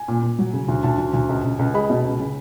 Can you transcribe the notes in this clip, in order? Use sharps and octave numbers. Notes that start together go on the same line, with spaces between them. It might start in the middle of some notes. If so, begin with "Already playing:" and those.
Already playing: G#5
A#2
A#2
F#3
C#3
D2
D2 A5
D2
D2
C#2
C#2
C#2
G#3 B5
B2
C#2
C#3